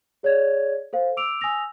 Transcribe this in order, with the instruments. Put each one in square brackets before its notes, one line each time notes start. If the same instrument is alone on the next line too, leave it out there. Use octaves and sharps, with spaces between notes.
[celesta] G#4 C#5 D5 G#6
A4 C5 F5
D6 E6 D7 F7
G#5 D#6 E6 A#6 F7